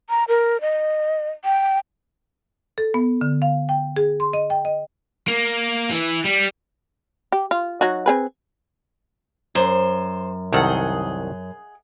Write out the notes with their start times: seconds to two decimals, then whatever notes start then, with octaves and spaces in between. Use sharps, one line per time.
0.10 A#5
0.28 A#4
0.61 D#5
1.45 G5
2.78 A4
2.94 B3
3.21 D3
3.42 F5
3.69 G5
3.96 G#4
4.20 C6
4.33 D#5
4.50 G5
4.65 D#5
5.28 A#3
5.91 E3
6.24 G3
7.32 G4
7.51 F4
7.81 F#3 D#4 F#4
8.06 C4 G#4 B4
9.55 F#2 C5
10.53 C2 D#3 G#4 A4 D#5 F#5